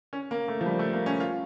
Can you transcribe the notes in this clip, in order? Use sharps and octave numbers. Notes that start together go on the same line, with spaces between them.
C#4
A#3
A3
F3
G3
A3
A#3
C#4
F4